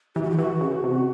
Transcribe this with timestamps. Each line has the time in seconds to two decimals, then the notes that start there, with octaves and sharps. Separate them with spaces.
0.15 E3 G4
0.23 F#4
0.30 G4
0.38 E3 F#4
0.61 C#3
0.84 C3